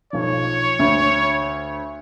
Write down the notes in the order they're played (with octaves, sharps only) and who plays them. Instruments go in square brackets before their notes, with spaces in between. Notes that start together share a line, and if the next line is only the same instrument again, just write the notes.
[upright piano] B1 F3 [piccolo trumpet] C#5
[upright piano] D2